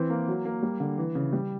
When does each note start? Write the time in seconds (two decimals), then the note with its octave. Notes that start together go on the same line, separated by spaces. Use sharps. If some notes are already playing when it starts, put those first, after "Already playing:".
Already playing: E3 C4
0.10 A#3
0.28 F#3
0.45 A#3
0.62 G3
0.80 D3
0.98 E3
1.15 C#3
1.33 G3